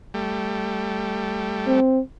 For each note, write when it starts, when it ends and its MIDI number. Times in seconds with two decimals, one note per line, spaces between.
0.14 1.80 55
0.14 1.80 57
1.67 1.99 60